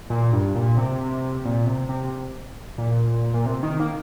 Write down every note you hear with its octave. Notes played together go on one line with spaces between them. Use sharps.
A#2
G2
A#2
C3
A#2
C3
C3
A#2
A#2
C3
D#3
A#3